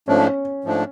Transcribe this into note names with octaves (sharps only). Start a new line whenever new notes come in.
G#2 F3 A3 C#4 D4
G#2 F3 A3 D4